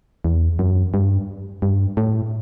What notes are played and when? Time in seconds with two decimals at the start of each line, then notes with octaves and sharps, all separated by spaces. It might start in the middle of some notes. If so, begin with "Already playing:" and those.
0.24 E2
0.59 F#2
0.94 G2
1.62 G2
1.97 A2